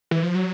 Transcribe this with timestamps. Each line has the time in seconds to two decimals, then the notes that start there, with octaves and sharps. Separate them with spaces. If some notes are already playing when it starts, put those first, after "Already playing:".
0.11 E3
0.23 F3
0.35 F#3